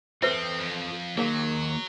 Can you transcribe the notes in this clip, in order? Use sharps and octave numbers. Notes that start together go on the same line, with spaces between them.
C4 F4 A4 B4 C5 E5
F2
D#3 F#3 A#3 G#4 A#4 F5